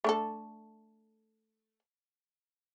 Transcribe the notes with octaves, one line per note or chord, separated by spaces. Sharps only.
A3 D4 A4